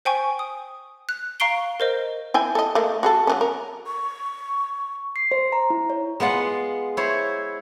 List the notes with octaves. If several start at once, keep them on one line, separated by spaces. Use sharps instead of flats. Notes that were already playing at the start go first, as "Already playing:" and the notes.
C5 G5 G#5 C#6
D#6
F#6
F5 A#5 C#6 C7 D7 G7
A#4 C5 D#5
E4 G5 G#5
A4 D#5
A3 A#3
F#4 G#4 A4
F#3 B3 C#4
A#4
C#6
C7
C5
A#5
E4
C#5
G#3 B3 F4 F#5
E4 C5 C#5